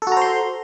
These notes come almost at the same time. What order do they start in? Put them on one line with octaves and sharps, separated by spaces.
A4 F#4 A#5 C5 C6